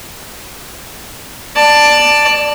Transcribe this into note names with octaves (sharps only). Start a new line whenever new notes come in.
D5 A5